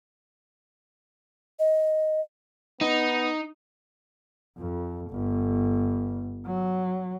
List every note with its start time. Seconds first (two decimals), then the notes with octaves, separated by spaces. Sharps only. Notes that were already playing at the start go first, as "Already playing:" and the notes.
1.59 D#5
2.81 B3 D#4
4.58 F2
5.10 G1
6.46 F#3